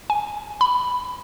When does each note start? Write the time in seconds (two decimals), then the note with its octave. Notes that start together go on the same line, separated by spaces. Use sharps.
0.10 G#5
0.61 B5